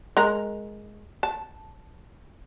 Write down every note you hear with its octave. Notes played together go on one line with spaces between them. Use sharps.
G#3 A#4
A5